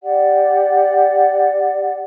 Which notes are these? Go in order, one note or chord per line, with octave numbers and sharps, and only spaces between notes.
G4 D5 F#5